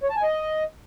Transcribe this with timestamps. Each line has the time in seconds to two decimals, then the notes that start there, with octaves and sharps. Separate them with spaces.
0.03 C#5
0.10 A5
0.16 G#5
0.23 D#5